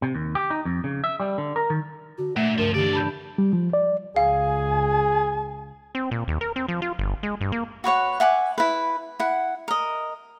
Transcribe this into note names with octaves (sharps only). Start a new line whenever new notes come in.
C3
D#2
G4
D#4
F2
C#3
E5
G3
D3
A#4
D#3
D3 F#4
A#2 A3 E5
C#2 G2 F3 A#4
F2 D3 E3 G4 D5
A5 B5 G6
G3
F3
D5
C#2 G#4 F5 G#5
C4
A#2
D#2
A#4
C4
F3
F4
G1
G#3
G2
A#3
F#4 B4 C#5 F#5
E5 F#5 G#5 D6
E4 B4
E4 F#5
A#4 D#5